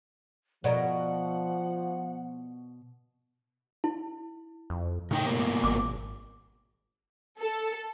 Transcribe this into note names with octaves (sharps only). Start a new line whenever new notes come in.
B2 F3 A#4 C5 D5 D#5 F#5
E4
F2
A2 C#3 D#4 G5
G2 B2 A#3
G#1 D6
A4